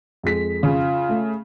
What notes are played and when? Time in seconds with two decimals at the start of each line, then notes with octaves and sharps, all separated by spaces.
0.23 F2 G#3 B6
0.63 C#3 F4
1.09 A3